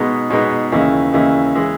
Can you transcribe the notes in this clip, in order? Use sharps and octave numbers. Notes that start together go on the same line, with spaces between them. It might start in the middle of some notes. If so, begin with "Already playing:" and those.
Already playing: B2 G#3 B3 D#4
B2 G#3 B3 D#4
D#2 C#3 E3
D#2 C#3 E3
E3 G#3